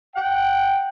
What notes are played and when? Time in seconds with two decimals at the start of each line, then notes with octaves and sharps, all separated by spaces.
0.15 F#5 G5